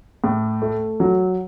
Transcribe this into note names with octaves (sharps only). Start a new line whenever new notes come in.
A2
A3
F#3